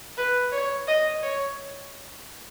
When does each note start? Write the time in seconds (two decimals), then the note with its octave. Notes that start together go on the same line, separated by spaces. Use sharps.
0.17 B4
0.52 C#5
0.88 D#5
1.23 C#5